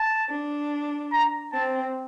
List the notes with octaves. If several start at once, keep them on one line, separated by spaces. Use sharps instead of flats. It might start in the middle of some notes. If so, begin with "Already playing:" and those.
Already playing: A5
D4
A#5
C4 A5